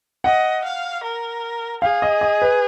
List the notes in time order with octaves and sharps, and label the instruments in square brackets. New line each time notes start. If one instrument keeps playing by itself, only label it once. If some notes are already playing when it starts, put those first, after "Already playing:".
[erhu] D#5 [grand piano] F#5
[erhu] F5
A#4
[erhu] G#4 [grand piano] F5
[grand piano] D#5
D#5
B4